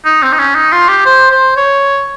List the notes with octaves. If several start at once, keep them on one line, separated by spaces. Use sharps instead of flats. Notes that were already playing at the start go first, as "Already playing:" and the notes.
D#4
C4
D#4
C#4
D#4
F4
G4
C5
C5
C#5